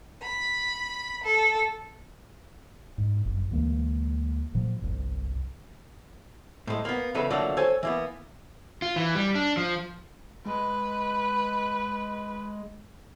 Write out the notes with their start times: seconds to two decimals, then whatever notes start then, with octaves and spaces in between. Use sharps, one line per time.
0.22 B5
1.24 A4
2.98 G#2
3.25 G1 F#2
3.51 D2 E3 G#3 A#3
4.55 A#2 F3 F#3
4.82 G1 C2 F2
6.67 A2 G#3
6.85 A#3 B3
7.15 E2 C#3 F#3 A4 B4
7.30 D3 F3 F#3 A3 A#3
7.57 A4 C5 C#5 G#5
7.83 E3 A#3 B3
8.82 F4
8.96 E3
9.15 G3
9.35 D4
9.57 F3
10.46 G#3 B4